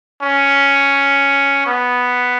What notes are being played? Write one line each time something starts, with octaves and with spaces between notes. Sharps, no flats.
C#4
B3